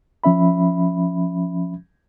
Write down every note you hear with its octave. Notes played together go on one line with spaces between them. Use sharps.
F3 C#4 E5 B5